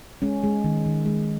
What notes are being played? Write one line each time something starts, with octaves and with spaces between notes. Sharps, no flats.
G#3 C#4
G#3
D#3
D#3
G#3